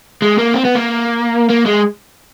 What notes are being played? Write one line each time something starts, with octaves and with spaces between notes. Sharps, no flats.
G#3
A#3
C4
B3
A#3
A#3
G#3